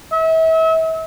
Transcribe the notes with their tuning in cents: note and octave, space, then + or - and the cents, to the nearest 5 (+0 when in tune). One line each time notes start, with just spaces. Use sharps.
E5 -35